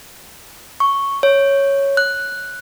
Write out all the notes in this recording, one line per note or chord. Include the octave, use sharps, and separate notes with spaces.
C#6
C#5
F#6